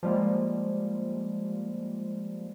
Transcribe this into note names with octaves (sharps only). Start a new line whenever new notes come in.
F3 G3 G#3 A#3